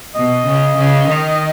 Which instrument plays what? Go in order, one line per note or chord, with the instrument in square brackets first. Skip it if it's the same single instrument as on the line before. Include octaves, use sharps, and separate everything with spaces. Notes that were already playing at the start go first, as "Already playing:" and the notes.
[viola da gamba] B2 [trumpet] D#5
[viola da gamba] C#3
C#3
D#3